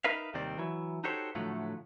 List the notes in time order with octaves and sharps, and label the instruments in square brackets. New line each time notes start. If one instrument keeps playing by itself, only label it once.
[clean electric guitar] D#4 A#4 B4 E5 F5
D#2 C3 D#3 G3 C4 D5
E3 F#3 E4
D#4 F#4 G4 A4 C5 C#5
A2 D3 F3 F#3 A3